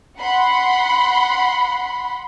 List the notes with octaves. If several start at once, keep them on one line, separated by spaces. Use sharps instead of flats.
F#5 B5 C6